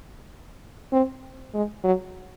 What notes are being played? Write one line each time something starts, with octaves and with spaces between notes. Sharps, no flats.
C4
G#3
F#3